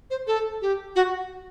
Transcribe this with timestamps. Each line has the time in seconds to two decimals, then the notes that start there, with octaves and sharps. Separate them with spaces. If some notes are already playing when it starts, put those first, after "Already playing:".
0.10 C5
0.27 A4
0.62 G4
0.96 F#4